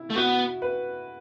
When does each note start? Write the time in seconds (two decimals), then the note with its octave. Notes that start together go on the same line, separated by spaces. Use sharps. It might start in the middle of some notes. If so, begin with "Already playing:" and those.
Already playing: E4
0.10 A3
0.16 B3 F#4
0.62 B4